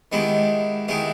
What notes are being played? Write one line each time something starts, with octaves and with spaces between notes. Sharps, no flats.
D#3 G#3 B3 E4 G4
D#3 G#3 B3 E4 G4